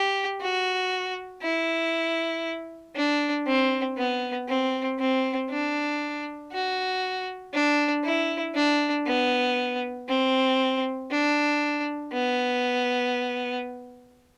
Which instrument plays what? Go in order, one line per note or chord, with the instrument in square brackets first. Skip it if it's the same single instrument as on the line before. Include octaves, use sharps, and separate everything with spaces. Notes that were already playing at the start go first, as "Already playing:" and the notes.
Already playing: [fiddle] G4
F#4
E4
D4
C4
B3
C4
C4
D4
F#4
D4
E4
D4
B3
C4
D4
B3